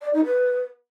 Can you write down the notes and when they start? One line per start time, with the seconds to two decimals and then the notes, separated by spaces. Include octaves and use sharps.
0.02 D5
0.13 D#4
0.25 B4